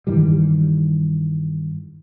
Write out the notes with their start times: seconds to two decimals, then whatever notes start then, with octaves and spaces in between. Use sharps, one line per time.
0.07 G2 D#3 E3 G3